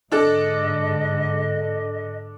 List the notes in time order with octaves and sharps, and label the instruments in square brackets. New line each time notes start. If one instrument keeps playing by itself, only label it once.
[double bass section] G#2 D3 [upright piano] D4 A4 [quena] D#5